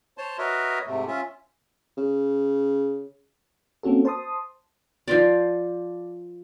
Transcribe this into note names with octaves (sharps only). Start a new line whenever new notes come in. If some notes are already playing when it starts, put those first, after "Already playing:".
C5 C#5 A5 C6
F#4 A#4 B4 C#5 D#5 E5
G#2 C3 A3
C#4 F4 E5
C#3
A#3 C4 C#4 F#4 A4
C5 A5 C6 D#6
F3 F4 D5